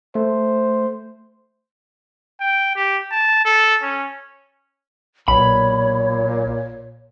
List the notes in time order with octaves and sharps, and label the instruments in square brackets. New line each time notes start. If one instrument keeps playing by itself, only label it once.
[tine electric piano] A3 [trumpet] C5
[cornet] G5
G4
A5
A4
C#4
[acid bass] B1 [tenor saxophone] A#2 [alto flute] C#5 [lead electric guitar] B5